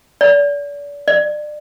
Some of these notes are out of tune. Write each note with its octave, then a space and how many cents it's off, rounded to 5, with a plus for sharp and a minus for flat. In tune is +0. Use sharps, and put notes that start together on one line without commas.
D5 -35
D5 +30